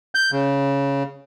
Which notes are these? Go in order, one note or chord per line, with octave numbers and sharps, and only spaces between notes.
G6
C#3